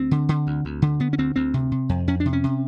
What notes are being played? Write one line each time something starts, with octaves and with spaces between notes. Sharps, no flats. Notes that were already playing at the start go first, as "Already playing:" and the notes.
Already playing: D2 C4
D3
D3
D2
D2
D3
D3 B3
C#4
D2 C4
D2 C4
C3
C3
F2
F2 C#4
D4
C3
C#4
C3